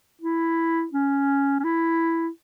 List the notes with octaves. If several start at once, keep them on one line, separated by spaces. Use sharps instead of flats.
E4
C#4
C#4
E4